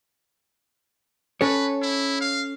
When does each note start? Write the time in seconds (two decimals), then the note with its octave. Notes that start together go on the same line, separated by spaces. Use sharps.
1.41 C#4 A4 B4 C#5
1.82 E4
2.21 F5